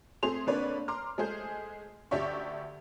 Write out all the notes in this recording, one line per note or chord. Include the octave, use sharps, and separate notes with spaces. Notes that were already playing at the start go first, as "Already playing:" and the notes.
A3 C4 G#4 C6 F7
D3 A#3 C4 B4 C#5 D5
A#5 C6 D6 F6
G#3 A3 G#4 C5
D2 G4 D5 E5 C#6